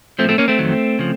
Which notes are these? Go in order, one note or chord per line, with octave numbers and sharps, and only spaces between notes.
F3 A3 C4
A2
A3 C4
A#3 C#4
A3 C4
F2 D#3 F#3
C#3 F3